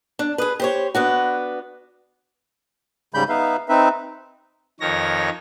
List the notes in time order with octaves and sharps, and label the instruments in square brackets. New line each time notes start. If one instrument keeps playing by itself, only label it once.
[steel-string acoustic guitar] D4
G#4 B4
G4 C5 C#5
B3 D4 F#4
[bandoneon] G#2 C#3 G3 B5 G6
B3 D#4 B4 E5 F5
C4 D#4 B4 E5
[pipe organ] F2 D#3 C#5 A#6